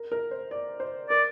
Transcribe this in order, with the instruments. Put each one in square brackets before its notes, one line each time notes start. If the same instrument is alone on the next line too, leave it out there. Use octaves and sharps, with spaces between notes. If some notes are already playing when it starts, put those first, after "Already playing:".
Already playing: [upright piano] A#4
A#4
C5
D5
C5
[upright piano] A#4 [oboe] D5